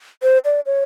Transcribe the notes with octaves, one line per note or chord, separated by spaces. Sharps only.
C5
D5
C#5